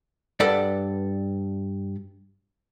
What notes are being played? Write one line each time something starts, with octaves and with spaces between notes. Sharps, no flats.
G2 A4 B4 D5 F#5